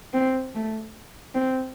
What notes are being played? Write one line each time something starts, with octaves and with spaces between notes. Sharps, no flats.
C4
A3
C4